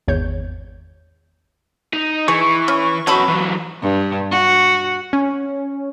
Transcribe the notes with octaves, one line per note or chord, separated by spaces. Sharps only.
G#1 E2 C#5 G6
D#4
E3 G#4 C#6
C#4
B2 C#4 F#4 A4 B5
E3 F#3
G2
F#4
C#4